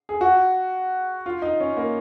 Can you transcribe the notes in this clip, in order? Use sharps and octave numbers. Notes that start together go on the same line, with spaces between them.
G#4
F#4
F4
D#4
C#4
A#3